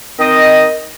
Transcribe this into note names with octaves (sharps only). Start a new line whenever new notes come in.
D#3 C4 D#5